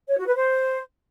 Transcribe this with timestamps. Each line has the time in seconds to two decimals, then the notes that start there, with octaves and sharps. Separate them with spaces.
0.08 C#5
0.17 F#4
0.26 B4
0.35 C5